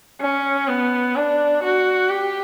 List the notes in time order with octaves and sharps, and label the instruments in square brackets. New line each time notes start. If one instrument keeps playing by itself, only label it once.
[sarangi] C#4
B3
D4
F#4
G4